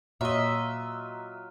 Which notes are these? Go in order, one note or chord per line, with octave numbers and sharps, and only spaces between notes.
A#2 F#3 F4 D#5 E5